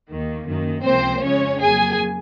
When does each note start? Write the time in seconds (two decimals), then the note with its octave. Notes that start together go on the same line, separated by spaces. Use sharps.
0.08 D#2 D#3 A#3
0.47 F#2 D#3 A#3
0.84 C#2 C3 F3 A#3 C4 C5
1.23 F2 C#3 G#3 C#4 C#5
1.61 F2 C#3 F#3 A#3 G#4 G#5